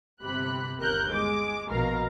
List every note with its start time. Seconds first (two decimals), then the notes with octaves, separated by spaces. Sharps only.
0.23 G1 C3 G4 B5 F#6
0.79 G1 D#2 A#4 F#6 G6
1.12 G#3 D6
1.68 A#1 B2 A#4 F5 A#5